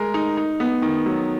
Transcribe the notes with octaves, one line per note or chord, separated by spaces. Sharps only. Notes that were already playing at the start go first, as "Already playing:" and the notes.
Already playing: G#3 A#4
D#4
D#4
B3
D#3
F#3